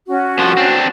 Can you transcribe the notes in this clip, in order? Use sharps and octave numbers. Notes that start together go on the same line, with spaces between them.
C#4 F#4
C2 F3
C4 D4